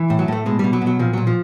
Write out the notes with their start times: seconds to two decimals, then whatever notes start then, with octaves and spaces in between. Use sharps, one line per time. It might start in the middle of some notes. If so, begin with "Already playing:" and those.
Already playing: E3
0.10 A2
0.19 F#3
0.28 A2 A3
0.46 B2 G#3
0.59 B2 G3
0.73 F#3
0.82 B2
0.87 F#3
0.99 A#2 F3
1.13 A#2 F#3
1.27 F3